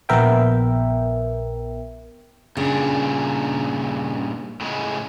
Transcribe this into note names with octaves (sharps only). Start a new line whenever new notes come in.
A#1 B3 A#4 E5 G5
G2 A#2 C#3 D4
A2 C#3 G#3